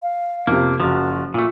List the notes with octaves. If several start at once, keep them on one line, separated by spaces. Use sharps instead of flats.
F5
F2 C3 A#3
F#1 F3 F#4
A#2 A3 F4